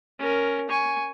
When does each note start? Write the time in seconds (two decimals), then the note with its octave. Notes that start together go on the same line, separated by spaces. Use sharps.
0.19 C#4 A#4
0.70 G#5 C#6